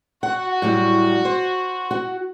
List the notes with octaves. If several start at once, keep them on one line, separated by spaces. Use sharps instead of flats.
F#4 F#5
A2 F#3 G3
C5
F#4